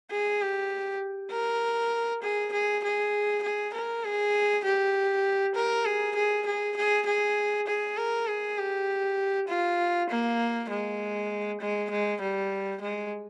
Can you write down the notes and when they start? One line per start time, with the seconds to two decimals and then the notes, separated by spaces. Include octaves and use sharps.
0.11 G#4
0.41 G4
1.31 A#4
2.22 G#4
2.52 G#4
2.83 G#4
3.43 G#4
3.74 A#4
4.04 G#4
4.64 G4
5.55 A#4
5.85 G#4
6.15 G#4
6.46 G#4
6.77 G#4
7.06 G#4
7.67 G#4
7.97 A#4
8.27 G#4
8.58 G4
9.48 F4
10.10 A#3
10.69 G#3
11.61 G#3
11.90 G#3
12.21 G3
12.81 G#3